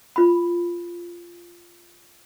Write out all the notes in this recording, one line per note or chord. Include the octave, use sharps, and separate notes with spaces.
F4 B5